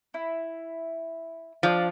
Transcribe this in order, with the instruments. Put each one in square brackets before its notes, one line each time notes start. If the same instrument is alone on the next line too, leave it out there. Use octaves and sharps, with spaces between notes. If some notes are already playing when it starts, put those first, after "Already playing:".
[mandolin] E4
[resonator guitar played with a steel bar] F3 [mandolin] D4 F4 D5